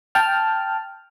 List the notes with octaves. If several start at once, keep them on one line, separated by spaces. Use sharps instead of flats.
G5 A5 F6